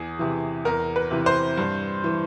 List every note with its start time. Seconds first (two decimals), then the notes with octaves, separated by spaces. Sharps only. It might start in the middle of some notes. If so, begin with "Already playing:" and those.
Already playing: E2 G#4
0.19 C3 E3
0.65 E2 A#4
0.96 B4
1.11 C3 E3
1.26 C5
1.57 G2
2.04 E3